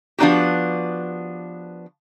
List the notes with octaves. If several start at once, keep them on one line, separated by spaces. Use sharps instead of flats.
F3 B3 D4 D#4 F#4 G4